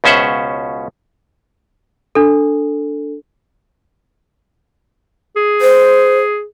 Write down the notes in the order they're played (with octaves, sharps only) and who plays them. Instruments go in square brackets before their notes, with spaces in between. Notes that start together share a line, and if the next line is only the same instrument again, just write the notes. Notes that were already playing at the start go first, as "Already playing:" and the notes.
[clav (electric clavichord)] C#2 B2 C#4 C5 E5 F#5
[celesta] D4 A4
[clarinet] G#4
[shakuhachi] C5